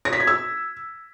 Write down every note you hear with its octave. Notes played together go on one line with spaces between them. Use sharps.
A#6
B6
G#6
E6